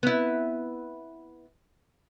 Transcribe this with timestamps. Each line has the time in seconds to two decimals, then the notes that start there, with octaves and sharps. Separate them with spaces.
0.03 B3 E4